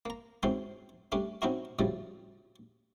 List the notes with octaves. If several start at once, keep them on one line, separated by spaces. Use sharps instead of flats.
A#3 A#5
G#2 E3 F#3 C4 C#4 C6
G3 A3 C#4 D4
F#3 C4 C#4 D#4 E4 F#4
D2 A2 C#3 F3 G3